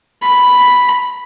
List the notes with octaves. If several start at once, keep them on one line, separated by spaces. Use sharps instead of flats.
B5